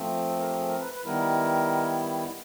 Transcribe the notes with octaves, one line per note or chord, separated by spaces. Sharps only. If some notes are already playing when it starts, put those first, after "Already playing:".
Already playing: F3 A3 C4
A4
A#4
G4
G#4
A#4
B4
B4
D#3 G3 B3 E4 A#4